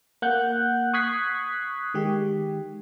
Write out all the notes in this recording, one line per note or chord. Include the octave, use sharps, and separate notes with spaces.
A#3 F#5 F#6 G6
C#6 D#6 F#6 G#6 B6 C7
D#3 G#3 G4